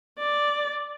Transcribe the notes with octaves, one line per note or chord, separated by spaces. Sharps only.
D5